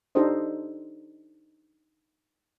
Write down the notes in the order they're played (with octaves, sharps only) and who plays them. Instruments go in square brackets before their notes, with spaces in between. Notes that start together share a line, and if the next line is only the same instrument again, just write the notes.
[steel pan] D4 D#4 G4 A4 C5 D#5